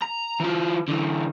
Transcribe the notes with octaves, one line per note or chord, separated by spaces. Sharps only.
A#5
E3 F4
D3 E3